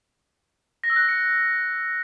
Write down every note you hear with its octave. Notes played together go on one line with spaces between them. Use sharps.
A#6
E6
F#6
E6
C#7